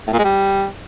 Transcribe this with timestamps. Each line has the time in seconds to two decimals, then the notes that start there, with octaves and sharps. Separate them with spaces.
0.07 A2
0.13 A#2
0.19 G#3
0.24 G3